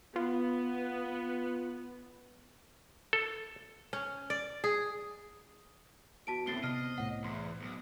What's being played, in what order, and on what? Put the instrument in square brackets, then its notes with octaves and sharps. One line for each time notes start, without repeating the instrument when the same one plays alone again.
[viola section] B3 [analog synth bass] F4
[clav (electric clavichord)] A4
[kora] C#4
D5
G#4
[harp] E2 [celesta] F#4 A5 D7
[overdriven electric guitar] A2 [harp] D3 B3 C4 [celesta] A6 C7 G7
[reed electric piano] C3 [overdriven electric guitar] D#5 [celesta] F6 C7
[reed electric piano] C2 A2 [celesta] F#5
[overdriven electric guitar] E2 [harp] C6
[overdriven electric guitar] B1